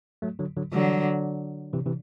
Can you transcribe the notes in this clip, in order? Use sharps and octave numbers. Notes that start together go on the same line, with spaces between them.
F#3 A3
D3 F#3
D3 F#3
D3 E3 F#3 G3
C3 E3
C3 E3